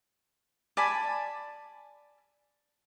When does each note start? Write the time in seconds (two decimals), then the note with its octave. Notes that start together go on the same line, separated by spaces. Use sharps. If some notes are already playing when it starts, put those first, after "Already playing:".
0.77 D5 G#5 A5 B5